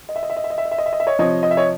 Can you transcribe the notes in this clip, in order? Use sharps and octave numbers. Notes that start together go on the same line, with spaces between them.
D#5
E5
D#5
E5
D#5
E5
D#5
E5
D#5
E5
D#5
E5
D#5
E5
C#5 D#5
C3 F3 C#5 D#5
D#5
E5
C#5 D#5